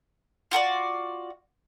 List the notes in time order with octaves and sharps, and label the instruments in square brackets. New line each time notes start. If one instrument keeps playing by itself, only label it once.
[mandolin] F4 F#4 A4 D5